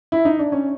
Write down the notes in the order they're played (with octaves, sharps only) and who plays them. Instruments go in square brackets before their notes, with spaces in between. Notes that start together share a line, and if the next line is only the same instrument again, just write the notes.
[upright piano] E4
D#4
D4
C#4